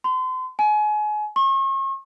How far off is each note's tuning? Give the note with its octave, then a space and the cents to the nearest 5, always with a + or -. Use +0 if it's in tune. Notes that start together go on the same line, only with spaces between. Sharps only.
C6 -35
G#5 +30
C#6 -40